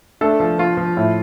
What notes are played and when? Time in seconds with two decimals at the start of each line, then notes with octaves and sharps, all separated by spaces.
0.21 A3 D4 A4
0.40 F3
0.58 F3 F4
0.77 F3
0.97 A2